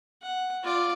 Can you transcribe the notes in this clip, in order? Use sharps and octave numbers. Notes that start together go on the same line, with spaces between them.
F#5
F4 D5